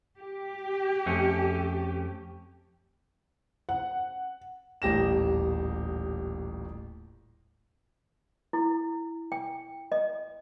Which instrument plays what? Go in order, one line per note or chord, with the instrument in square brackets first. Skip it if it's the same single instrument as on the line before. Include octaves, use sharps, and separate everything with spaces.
[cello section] G4
[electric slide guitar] F2 A3 C#4
[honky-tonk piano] F#5
[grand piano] D#1 A1 G4 A#6 E7
[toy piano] E4
G5
D#5